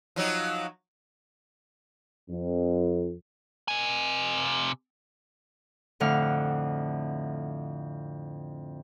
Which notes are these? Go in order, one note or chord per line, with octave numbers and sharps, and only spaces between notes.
F3 F#3 D#4
F2
C3 G#5
F2 A2 D3 F#5 F6